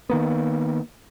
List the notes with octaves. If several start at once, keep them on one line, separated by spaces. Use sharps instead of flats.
D#3 A#3 B3